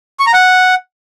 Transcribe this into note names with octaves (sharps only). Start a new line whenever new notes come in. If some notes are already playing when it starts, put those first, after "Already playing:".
C#6
A#5
F#5